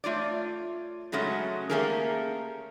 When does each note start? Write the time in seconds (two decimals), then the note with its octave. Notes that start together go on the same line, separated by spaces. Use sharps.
0.04 A3 F4 C#5 D5
1.12 C#3 F#3 G#3 A3 C#4
1.70 A3 A#3 C#4 G4 G#4 A#4